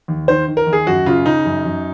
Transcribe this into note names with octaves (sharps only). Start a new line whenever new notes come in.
D#2
D#3 C5
D#3
A#4
D#2
G#4
F#2 F#4
C#3 F4
C#3 D#4
F#2
F#2